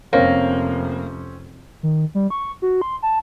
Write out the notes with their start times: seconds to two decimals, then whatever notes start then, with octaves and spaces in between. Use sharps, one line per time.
0.13 F1 A#3 C4 C#4 C5
1.83 D#3
2.15 G3
2.30 C#6
2.62 F#4
2.81 C6
3.02 A5